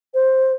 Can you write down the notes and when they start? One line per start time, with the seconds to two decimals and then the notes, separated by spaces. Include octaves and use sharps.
0.14 C5